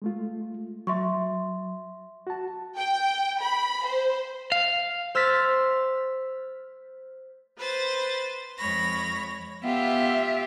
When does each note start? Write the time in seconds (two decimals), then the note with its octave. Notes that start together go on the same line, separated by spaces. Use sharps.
0.02 G#3 A3 F4
0.87 F#3 E5 C6 C#6
2.27 F#4 A5
2.77 G5
3.41 B5
3.85 C5
4.52 F5
5.15 C5 E6 F6 A6 B6
7.57 B4 C5 A6
8.57 F2 G#3 C#5 B5 A#6
9.64 B3 F4 G4 E5